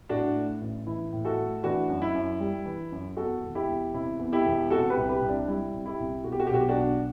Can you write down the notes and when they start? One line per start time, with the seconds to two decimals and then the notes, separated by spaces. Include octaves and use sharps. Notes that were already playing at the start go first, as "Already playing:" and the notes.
0.09 A2 D4 F#4
0.35 A3
0.61 A1
0.87 E3 E4
1.13 A2
1.25 F#4 A4
1.38 A3
1.63 E3 D4 F#4
1.89 F#2
2.02 E4
2.15 F#2
2.40 G3
2.66 E3
2.92 F#2
3.17 E2 F#4 A4
3.43 E1
3.55 E4 G4
3.69 E1
3.94 C3 E4
4.19 E2
4.32 E4 G4
4.46 E1
4.70 C3 F#4 A4
4.90 G4 B4
4.97 C2
5.09 G4 B4
5.22 C2
5.28 D4
5.48 G3 E4
5.73 C3
5.86 E4 G4
6.00 C2
6.24 B2 F#4
6.32 G4
6.40 F#4
6.47 G4
6.50 B1 F#4
6.61 G4
6.69 D4 F#4
6.76 B1